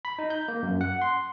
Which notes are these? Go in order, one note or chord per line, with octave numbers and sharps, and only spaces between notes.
B5
D#4
G6
A#3
F#2
F#5
C6